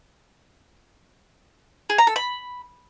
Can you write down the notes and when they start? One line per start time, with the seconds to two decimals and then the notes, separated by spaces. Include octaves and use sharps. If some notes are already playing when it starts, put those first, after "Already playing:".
1.90 G#4
1.98 A#5
2.07 A4
2.16 B5